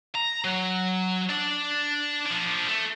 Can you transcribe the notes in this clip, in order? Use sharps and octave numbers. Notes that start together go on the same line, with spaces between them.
A#5
F#3
D4 D5
F3 D4
A3